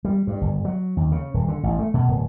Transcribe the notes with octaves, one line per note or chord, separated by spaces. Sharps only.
G3
G2
G1
F#3
D#2
C#3
D#1
D3
A1
A3
B2
D1